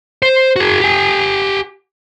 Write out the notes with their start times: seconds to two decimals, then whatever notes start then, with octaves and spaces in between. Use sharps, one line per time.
0.23 C5
0.56 F#4 G#4
0.81 G4 G#5